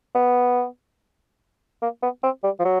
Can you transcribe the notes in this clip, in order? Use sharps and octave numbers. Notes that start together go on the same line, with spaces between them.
B3
A#3
B3
C4
G3
F3
F#3